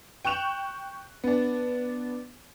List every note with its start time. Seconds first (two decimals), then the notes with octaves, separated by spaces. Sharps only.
0.25 G5 C#6 F#6 E7 F7
1.24 B3 D4